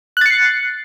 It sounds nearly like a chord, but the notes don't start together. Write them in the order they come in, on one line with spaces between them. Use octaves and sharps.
F#6 A6 C#7 C7